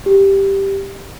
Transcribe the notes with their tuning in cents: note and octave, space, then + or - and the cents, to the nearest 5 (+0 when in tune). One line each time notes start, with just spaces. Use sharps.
G4 +0